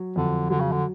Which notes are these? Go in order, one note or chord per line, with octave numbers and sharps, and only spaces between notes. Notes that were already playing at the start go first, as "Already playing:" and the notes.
Already playing: F#3
F2 D3
D3 F#3
C#3
D3